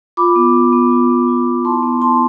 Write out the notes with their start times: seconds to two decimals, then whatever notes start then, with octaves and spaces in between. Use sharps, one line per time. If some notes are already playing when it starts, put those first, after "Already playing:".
0.17 F4 B5 D6
0.36 B3
0.54 F4
0.73 B3
0.91 F4
1.10 B3
1.28 F4
1.46 B3
1.65 E4 A5 C6
1.83 B3
2.01 E4 A5 C6